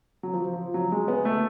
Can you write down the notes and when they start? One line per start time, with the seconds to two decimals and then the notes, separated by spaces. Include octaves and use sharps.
0.23 F#3
0.34 F3
0.53 F3
0.74 F#3
0.92 G#3
1.08 B3
1.25 A3